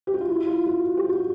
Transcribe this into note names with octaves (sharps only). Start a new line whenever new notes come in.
G4
F#4
F4
E4
F4
F#4
G4
F#4